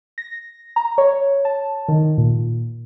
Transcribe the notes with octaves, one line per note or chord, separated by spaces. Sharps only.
A#6
A#5
C#5
A5
D#3
A#2